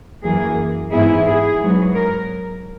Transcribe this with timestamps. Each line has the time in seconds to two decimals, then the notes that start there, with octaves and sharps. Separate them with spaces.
0.24 F#2 E3 A#3 G#4
0.92 G#2 E3 B3 E4 G#4
1.26 G#4
1.60 G#2 F#3 B3
1.95 A#4